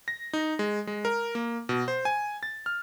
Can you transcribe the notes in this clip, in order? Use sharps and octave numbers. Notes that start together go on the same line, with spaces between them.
A#6
D#4
G#3
G#3
A#4
A#3
B2
C5
G#5
A6
F6